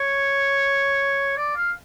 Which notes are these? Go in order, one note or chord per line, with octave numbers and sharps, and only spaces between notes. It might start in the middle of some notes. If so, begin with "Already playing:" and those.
Already playing: C#5
D5
F5